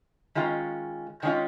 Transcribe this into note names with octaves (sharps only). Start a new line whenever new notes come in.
D#3 G#3 C#4 F4
D#3 G#3 C#4 F4